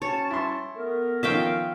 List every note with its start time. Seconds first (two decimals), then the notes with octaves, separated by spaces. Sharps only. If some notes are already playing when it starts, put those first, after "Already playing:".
0.02 F#3 C#4 C#5 A5
0.31 E4 C6
0.76 A3 B3 A#4
1.23 D#3 F3 C#4 E5 F5 G5